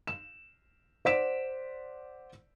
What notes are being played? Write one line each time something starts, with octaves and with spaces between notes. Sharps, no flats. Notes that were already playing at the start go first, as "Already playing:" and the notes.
E7
C5 D5 F#5 B6 D7 E7